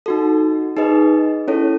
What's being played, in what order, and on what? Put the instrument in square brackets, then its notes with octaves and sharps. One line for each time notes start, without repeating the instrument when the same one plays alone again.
[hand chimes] D#4 F#4 A4
D#4 G#4 B4 D#5
C#4 E4 A4 C#5